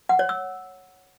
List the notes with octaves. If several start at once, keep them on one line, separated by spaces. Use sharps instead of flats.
F#5
C#5
E6